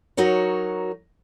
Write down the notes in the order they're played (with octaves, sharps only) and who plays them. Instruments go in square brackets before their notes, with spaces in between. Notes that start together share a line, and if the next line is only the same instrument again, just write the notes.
[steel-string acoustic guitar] F#3 D#4 F#4 A#4 C#5